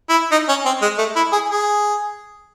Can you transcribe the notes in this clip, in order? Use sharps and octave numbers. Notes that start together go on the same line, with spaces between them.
E4
D#4
C#4
C4
G#3
A3
E4
G#4
G#4